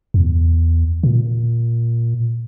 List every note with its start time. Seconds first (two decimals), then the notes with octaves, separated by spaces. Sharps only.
0.14 E2
1.03 A#2